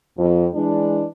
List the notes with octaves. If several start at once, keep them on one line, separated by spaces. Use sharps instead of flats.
F2
E3 G#3 D4